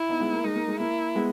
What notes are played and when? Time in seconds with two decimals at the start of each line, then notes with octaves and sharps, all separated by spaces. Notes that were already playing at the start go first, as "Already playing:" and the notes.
Already playing: E4
0.09 B3 D#4
0.20 G#3 B3
0.33 A#3
0.44 G#3 D#4
0.56 A#3
0.68 G#3
0.79 A#3 E4
1.15 G#3 B3